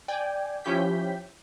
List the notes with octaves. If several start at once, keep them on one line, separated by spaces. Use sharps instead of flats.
D5 G5 G#5
F3 C#4 E4 G4 G6 B6